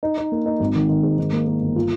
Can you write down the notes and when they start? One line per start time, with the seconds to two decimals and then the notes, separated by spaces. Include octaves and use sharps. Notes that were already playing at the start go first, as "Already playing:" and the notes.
0.03 D#4
0.18 D#4
0.32 A#3
0.46 D#4
0.60 G#1
0.75 D#3
0.89 D#3
1.03 G#2
1.18 D#3
1.33 A#3
1.47 A#3
1.61 G1
1.76 F4